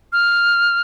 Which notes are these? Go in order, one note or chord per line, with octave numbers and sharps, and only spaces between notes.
F6